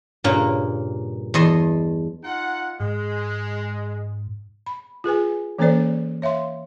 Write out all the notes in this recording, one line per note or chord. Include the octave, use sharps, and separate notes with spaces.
G2 A#2 C#3 A#3
E2 A4 D#5 C6
D#4 F4 F#5
G#2 G#3
B5
F4 G#4 B4 G#5
E3 A#3 C#4 A4 C5 D5
C#5 E5 F5 C6